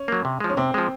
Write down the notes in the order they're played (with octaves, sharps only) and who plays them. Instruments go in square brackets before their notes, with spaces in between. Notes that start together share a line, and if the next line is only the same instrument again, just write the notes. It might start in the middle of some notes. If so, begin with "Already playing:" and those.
Already playing: [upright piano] C#4
[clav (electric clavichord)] F#3 A#3
C3
F3 G#3
[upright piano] C#4
[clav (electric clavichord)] C3 [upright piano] C4
[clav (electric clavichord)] F3 G#3